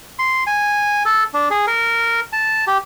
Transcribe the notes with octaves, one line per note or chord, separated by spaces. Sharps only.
C6
G#5
A4
D4
G#4
A#4
A5
G4